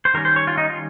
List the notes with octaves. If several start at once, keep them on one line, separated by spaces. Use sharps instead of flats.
C5
D#3 G3 C#4 A#4
C5
C#5
F4
D#4
F4